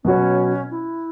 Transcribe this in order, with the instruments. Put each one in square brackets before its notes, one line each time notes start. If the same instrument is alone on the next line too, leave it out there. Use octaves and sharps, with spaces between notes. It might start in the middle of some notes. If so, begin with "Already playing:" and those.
[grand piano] B2 F#3 B3 F#4 C#5 [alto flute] C#4
[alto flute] E4